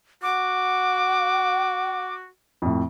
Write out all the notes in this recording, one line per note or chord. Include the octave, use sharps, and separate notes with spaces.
F#4 F#5 D6
F2 A2